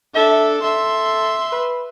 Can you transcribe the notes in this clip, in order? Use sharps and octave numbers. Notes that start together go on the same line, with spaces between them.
D4 A4 E5
A4 E5 C6
B4